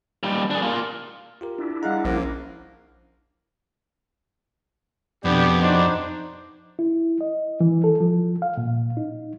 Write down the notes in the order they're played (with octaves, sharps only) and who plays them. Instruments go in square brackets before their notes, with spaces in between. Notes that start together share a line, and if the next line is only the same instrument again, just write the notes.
[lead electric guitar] D#2 G3
D4 G#4
A#3 F4
[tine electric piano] F4 G4 A#4
[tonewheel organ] D4 E4
[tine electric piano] G3 A#5 [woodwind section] G#3 F5 F#5
[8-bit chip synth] A#1 [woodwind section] A#3 [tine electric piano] C#4 C5
[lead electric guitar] F2 [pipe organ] B2 D4 [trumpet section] B3 G4
[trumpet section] D4 F#4 D6 [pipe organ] D#4 C5
[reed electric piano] E4
D#5
E3
A4
F3
F5
A#2
D#4